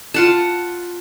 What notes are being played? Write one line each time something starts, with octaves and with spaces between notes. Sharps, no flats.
F4 F#5 A5